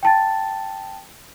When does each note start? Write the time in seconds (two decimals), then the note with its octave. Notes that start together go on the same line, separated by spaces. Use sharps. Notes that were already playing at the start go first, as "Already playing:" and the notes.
0.03 G5 A5 A6